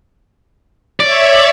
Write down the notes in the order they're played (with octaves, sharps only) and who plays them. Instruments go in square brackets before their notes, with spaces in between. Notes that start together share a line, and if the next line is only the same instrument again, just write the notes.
[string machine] C#5 E5 [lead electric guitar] D5